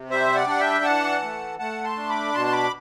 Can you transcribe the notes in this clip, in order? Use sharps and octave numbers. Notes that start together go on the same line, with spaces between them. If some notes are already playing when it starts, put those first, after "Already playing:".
Already playing: C3
G3 C5 E5
D5 F#5
D4 F#5
E5 G5
E3 F#5 A5
A3
A3 F#5 A5
A5 C6
D4
B5 D6
B2 A5 C6
C6
B5 D6